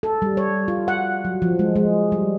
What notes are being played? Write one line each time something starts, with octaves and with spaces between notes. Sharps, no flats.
A4
G3
C#5
F4
F#5
F#3
F3
G#3
G#3
G3